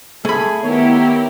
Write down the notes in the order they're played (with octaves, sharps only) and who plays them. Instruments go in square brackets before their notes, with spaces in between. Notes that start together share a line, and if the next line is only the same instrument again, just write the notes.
[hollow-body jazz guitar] A3 B5 [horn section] G#4
[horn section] D#3 C#5 [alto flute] B3 [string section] E4 G4 A#4